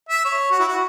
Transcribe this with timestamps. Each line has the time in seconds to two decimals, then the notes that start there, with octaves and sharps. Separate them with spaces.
0.09 E5
0.25 C#5
0.51 F#4
0.59 E4
0.68 F#4